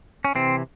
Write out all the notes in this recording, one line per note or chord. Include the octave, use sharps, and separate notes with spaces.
C#4
C3 E3 C4